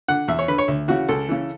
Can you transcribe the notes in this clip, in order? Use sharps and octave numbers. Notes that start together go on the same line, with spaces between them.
D3 F#5
E2 E5
C#5
D3 B4
C#5
D2
C#3 E3 F#4
C#2 A4
C#3 E3